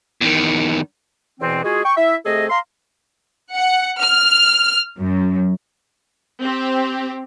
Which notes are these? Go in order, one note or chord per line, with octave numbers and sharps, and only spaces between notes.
E2 D#3
E2 B2 E3 C4
G#3 F4 F#4 G#4
G5 C#6
E4 E5
C3 A3 G#4 A4 D#5
F5 A#5 C6
F#5
F6
F#2
C4 G4